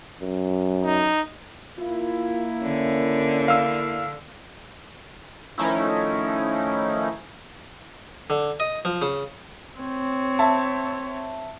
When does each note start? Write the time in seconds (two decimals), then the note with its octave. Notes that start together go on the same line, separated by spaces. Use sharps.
0.21 F#2
0.84 D#4
1.79 A#3 E4 F4
2.63 D3 C#4
3.48 F5 E6
5.58 D#3 F3 A3 C#4 D#4 E4
8.30 D3
8.60 D#5
8.85 F3
9.02 C#3
9.79 C4 C#5
10.39 E5 A5